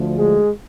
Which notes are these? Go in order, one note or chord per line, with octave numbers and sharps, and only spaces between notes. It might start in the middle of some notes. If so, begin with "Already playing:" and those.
Already playing: D2 D3 F3 A3
G#3 G#4